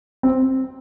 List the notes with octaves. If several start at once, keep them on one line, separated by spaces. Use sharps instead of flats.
C4